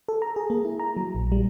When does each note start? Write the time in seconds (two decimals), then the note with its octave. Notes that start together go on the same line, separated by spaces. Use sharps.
0.08 A4
0.22 A#5
0.36 G#4
0.50 A#3
0.65 E4
0.79 A#5
0.97 F#3
1.15 A#1
1.32 G3